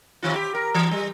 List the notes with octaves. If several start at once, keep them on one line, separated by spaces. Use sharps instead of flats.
C3 D#3 F4
G4
A#4
E3
G3